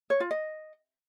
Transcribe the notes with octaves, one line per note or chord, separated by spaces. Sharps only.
C#5
F4
D#5